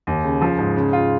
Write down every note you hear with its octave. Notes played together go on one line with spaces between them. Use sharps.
D#2
C#3
F3
G#2
C#3
F4